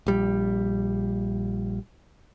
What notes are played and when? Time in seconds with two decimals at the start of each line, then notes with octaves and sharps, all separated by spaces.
0.07 A#1 G3